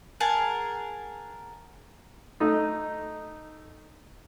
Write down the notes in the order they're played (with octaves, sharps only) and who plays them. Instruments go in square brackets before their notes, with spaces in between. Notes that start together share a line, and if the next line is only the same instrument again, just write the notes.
[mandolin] G#4 A#4 F#5 A5
[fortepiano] A3 D#4 D#5